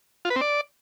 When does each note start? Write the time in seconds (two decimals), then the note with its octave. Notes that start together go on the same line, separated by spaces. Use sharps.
0.25 F4
0.30 B4
0.36 C4
0.41 D5